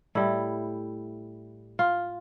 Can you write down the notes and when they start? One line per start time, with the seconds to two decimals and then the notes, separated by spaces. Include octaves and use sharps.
0.15 A2 G3 E4
1.79 F4